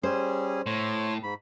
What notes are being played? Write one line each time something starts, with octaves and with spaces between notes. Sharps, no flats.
G3 C#4 G#4 C5
A2 C#5 C6
G#2 B5